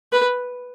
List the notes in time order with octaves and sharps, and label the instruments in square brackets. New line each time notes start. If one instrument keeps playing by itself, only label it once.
[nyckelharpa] B4